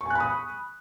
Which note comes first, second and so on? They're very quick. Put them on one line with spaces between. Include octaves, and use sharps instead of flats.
C#6 G#5 F#6 B5 D#6